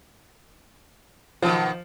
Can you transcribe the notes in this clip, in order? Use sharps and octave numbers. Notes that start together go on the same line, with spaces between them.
B2 D#3 F3